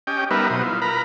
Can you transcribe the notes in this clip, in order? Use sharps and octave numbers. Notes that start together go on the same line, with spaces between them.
C#4 G4 D#5 G5
G3 B3 D#4 A#4 B4 E5
B2 F#3 C5 D#6
E4 F4
A#4 B4 A#5 B5